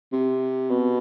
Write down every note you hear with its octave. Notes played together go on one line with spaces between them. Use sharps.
C3
B2